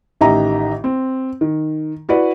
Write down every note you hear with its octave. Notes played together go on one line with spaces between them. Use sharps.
A1 D#3 G4 D#5 E5 A#5
C4
D#3
E4 F#4 B4 D5